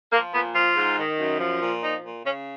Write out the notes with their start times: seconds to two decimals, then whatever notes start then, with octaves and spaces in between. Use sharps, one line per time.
0.12 F3 A#3
0.33 A#2 B3
0.54 F3 F4
0.76 G#2
0.97 D#3
1.18 F#2
1.40 F3
1.60 A#2
1.82 F3 D#4
2.03 A#2
2.24 C#3 C#4